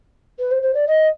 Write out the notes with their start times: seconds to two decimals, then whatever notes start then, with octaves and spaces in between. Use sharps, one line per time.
0.39 B4
0.51 C5
0.62 C5
0.74 D5
0.87 D#5